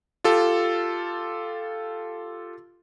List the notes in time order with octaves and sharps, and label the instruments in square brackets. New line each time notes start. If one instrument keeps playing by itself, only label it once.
[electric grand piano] F4 G4 A4